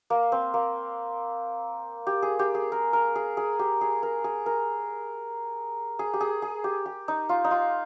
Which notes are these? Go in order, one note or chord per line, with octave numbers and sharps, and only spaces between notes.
A#3
C4
A#3
G4
G#4
G4
G#4
A#4
A#4
G#4
G#4
G4
G#4
A#4
G#4
A#4
G#4
G4
G#4
G#4
G4
G4
D#4
F4
D#4
F4